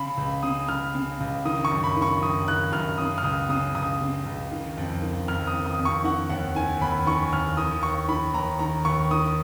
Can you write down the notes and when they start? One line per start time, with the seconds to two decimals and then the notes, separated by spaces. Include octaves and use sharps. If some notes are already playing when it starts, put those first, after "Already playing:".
Already playing: C#3 B5
0.17 C#2
0.43 C#3 D#6
0.68 C#2 F6
0.95 C#3
1.20 C#2
1.45 D#3 D#6
1.65 C#6
1.71 F#2
1.84 B5
1.97 D#3
2.02 C#6
2.22 F#2 D#6
2.47 D#3 F#6
2.72 F#2 F6
2.98 C#3 D#6
3.18 F6
3.23 C#2 D#6
3.49 C#3 D#6
3.75 C#2 D#6
4.01 C#3
4.26 C#2
4.52 D#3
4.78 F2
5.02 D#3
5.28 F2 F6
5.47 D#6
5.54 D#3
5.66 D#6
5.79 F2
5.85 C#6
6.04 D#3 F#5
6.30 D#2 F#5
6.55 D#3 G#5
6.81 D#2 B5
7.07 D#3 C#6
7.32 D#2 F6
7.57 D#3 D#6
7.83 D#2 C#6
8.08 D#3 B5
8.34 D#2 A#5
8.59 D#3 A#5
8.85 D#2 C#6
9.11 D#3 D#6